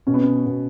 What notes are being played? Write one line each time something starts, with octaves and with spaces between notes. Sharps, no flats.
B2 C#4
B3
C#4
B2